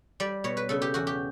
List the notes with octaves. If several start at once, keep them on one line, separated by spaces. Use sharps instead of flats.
G3 D5
B2 C#5
B4
C#3 A4
G4
E2 F#4
G4